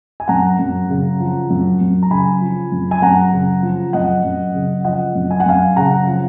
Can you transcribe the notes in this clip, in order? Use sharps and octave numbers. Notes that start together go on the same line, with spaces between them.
G#5
F#2 F#5 A#5
F#2
C#3
F3
F#2
F#2
A#5
C#3 G#5 B5
F3
F#2
G#5
F#2 F#5 A#5
C#3
F3
F#2 D#5 F#5
F#2
C#3
F3 D#5 F#5
F#2
G#5
F#5
F#2 F5 G#5
C#3 F#5 A#5
F3